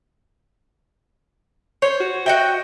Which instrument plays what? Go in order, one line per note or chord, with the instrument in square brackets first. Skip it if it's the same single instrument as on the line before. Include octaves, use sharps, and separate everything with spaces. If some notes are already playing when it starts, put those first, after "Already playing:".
[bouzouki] C5 [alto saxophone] C#5
[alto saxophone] F#4
[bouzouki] F#4 D#5 E5 [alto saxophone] G5